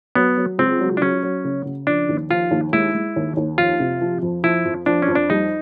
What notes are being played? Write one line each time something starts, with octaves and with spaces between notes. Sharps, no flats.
F#3 B3
F#3
C#2 C4
F#3
D4
F#3 C#4
F#3
C#3
C#3
F3 D4
D#2
F3 F4
D#2
G#3 E4
G#3
D#2
D#2
F2 F4
C3
F3
F2
F3 E4
F2
F3 D4
C#4
F2
D4
G3 D#4